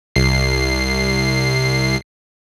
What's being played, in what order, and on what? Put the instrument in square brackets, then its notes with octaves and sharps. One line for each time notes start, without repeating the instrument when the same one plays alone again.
[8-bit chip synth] C2 C7